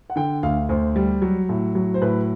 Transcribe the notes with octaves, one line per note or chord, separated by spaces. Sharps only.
F#5
D3 G5
D2 F5
D2 C5
G3
F#3
A2
F#3
C5
A2 B4